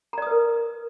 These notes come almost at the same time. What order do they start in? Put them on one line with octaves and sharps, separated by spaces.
A#5 D5 D#6 B4 A#4